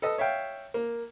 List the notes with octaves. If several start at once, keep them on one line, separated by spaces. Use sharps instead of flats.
A4 B4 D#5 E6
C#5 E5 F5 G5
A#3